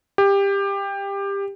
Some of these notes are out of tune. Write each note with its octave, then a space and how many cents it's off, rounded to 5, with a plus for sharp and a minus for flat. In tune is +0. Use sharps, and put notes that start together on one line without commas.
G4 +20